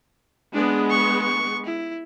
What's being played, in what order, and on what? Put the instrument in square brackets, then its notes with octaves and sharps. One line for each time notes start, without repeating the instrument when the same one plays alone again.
[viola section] G#3 B3 [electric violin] D4
[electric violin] C#6
C#6
E4